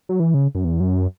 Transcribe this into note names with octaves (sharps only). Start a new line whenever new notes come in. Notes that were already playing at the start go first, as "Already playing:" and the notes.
F#3
E3
C#3
F#2
E2
F#2